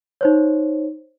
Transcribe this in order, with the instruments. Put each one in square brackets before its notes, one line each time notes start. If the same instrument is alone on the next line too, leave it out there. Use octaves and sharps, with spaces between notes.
[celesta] D#4 C5 C#5